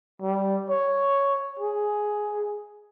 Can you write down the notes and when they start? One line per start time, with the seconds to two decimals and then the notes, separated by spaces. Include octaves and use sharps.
0.22 G3
0.70 C#5
1.60 G#4